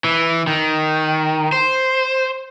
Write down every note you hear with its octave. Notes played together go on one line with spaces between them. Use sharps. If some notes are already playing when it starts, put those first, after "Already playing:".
E3
D#3
C5